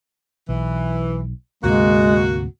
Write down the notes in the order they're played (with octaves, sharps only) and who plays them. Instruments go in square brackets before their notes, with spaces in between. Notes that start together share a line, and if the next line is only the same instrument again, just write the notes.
[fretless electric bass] B1 [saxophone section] E3
[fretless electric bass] D2 G#2 C3 [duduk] G#3 [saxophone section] A#3 F#4